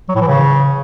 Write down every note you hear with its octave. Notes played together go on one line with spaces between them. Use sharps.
F#3
A2
E3
C#3